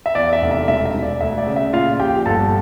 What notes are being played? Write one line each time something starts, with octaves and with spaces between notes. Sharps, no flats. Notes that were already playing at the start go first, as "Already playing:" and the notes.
E5
E2 D5
E5
F1
E5
E1 E5
E5
E1
D5
D2 E5
D5
C#3
E5
A#2 F4 F5
A#1 G4 G5
G1 A4 A5